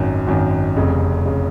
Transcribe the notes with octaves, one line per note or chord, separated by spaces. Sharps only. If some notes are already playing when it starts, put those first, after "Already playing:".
Already playing: G#1 F#2 D#3
G#1 F#2 D#3
F1 F2 C#3
C#3